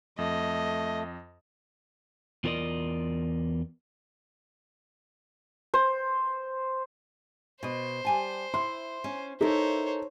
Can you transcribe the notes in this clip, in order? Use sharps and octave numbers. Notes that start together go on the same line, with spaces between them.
F2 A3 D#5
E2 F4 A#4 D5 D#5
C5
B2 C5 D#5
G3 G#5 A5
E4 C6
C#4
D#4 E4 A4 A#4 C5 C#5